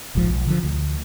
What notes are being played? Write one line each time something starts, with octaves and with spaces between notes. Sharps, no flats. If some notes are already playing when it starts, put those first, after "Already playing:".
E1 A#1 G#2 F3
B1
D3 F3
D2